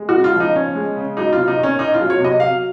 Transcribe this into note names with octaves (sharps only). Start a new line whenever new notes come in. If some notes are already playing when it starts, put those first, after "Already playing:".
Already playing: G#3
F#4
C#3
F4
F3
D#4
C#4
G#3
C#3
F#3 D#4
C3 F4
D#4
D#3 C#4
C#4 D#4
F4
F#3
C#5
C3 D#5
F#3 F5